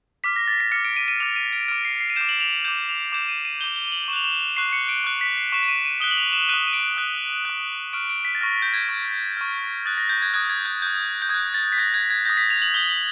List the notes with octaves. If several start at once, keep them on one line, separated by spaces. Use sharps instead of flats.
D6 F6 B6
A#6
A6
B6
D6 F6 C#7
D7
D#7
D#7
D6 F6 F7
D#7
D7
D6 F6 D7
C7
C7
D#7
D6 G6 E7
F#7
F7
D6 G6 E7
F7
D6 G6 E7
D#7
D#7
D6 G6 G7
G7
G7
F#7
C#6 F#6 E7 F7
E7
C#6 F#6 C7
C#7
D7
C#6 F#6
B6
C7
C#6 F#6 E7
D7
D#7
D#7
D#6 F#6 G7
F#7
F7
E7
D#6 F#6 D#7
D#7
D7
D#6 F#6
D#6 F#6
C#6 F6 D7
D7
B6
A6
C#6 F6 A#6
G6
G#6
C#6 F6
C#6 F6
D#6 F#6 A6
A#6
G6
G#6
D#6 F#6 G#6
G#6
G6
D#6 F#6 G6
G6
D#6 F#6 G#6
A6
B6
D#6 G6 A#6
G#6
G#6
D#6 G6 A#6
B6
F7
F#7
D#6 G6 G7
F#7